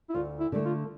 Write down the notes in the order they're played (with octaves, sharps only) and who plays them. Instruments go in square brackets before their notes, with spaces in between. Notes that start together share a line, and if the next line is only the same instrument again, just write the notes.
[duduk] E4
[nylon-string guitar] D2 [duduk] F4
[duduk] E4
[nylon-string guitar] D3 A3
[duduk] F4